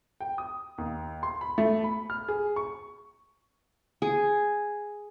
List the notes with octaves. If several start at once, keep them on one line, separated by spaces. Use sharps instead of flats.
G5
D#6
D#2
C6
B5
A3
B5
F6
G#4
C#6
G#4